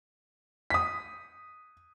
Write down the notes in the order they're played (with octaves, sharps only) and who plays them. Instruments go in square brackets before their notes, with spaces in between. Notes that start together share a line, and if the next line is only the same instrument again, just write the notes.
[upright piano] D#6 B6